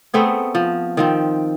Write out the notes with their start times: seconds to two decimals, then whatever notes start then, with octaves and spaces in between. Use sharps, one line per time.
0.14 A3 B3 C4 G#4
0.55 F3
0.97 D#3 F3 C4